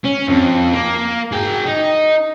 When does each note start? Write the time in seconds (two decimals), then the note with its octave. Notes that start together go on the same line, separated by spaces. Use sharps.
0.05 C#4
0.29 F2
0.73 A#3
1.33 G#4 G5
1.66 D#4